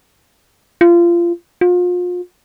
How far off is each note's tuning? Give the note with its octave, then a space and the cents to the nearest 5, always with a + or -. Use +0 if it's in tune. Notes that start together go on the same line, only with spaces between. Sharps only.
F4 -25
F4 +35